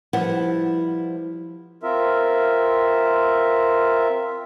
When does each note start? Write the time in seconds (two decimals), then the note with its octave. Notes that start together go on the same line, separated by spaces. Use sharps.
0.13 F3 G3 E4 B4 F#5
1.83 C4 F4 A#4 E5